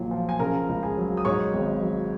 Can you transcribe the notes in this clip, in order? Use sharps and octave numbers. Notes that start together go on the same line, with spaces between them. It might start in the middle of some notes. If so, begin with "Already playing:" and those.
Already playing: A#1 A#2 F#3
F3
G#5
C#3 A#4 A#5
C#2
G#4 G#5
F#3
D#6
G#2 C#5 C#6
G#1
F#3